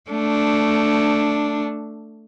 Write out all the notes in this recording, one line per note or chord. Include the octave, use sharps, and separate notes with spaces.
A3 D4